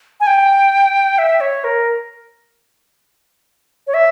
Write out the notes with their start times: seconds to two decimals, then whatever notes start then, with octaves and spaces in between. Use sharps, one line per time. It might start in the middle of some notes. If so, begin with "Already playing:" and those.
0.20 G#5
0.27 G5
1.18 E5
1.41 C#5
1.64 A#4
3.87 C#5
3.94 E5